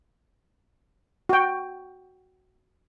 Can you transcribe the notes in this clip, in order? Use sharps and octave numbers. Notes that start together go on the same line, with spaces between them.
F#4 G5